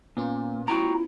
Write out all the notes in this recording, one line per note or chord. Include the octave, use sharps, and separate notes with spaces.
A#2 B3 C#4 F4
E4 F#4 G5 A#5